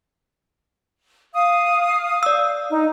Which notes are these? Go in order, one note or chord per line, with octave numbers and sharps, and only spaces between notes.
F5 D#6
D5 E6
D#4